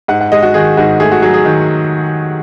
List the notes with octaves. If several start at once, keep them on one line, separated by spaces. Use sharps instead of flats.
G#2 F#5
F#5
G#3 D#5
F#4
D#3 G#4
G#2 F#4
A3 G#4
F#4
F#3 G#4
G#4
D#3